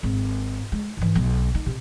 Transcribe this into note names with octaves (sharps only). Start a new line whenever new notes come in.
G#1
G#3
G#2 E3
B1 B3
D#4
C3